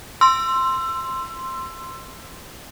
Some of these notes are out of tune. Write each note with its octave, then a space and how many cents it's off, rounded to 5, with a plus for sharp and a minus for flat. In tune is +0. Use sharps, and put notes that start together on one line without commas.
C6 +0 E6 +25